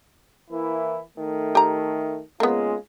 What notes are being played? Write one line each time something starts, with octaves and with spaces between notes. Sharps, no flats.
E3 A#3 E4
D#3 A3
G4 A#5
G#3 A#3 B3 C#4 F4